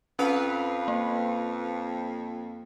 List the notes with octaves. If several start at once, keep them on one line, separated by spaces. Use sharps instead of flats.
F2 C#4 B4 F5
A#3